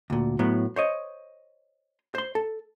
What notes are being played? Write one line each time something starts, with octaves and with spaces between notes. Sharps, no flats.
D2 A#2
A2 F#3 B3
C5 C#5 D#5
C5 C6
A4